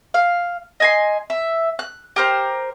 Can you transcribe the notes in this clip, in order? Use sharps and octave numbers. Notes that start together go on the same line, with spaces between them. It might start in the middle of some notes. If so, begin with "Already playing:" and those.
F5
D#5 G#5 C6
E5
F#6
G4 A#4 C5